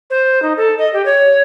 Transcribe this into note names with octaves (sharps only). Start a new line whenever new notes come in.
C5
D#4
A4
D#5
G4
C#5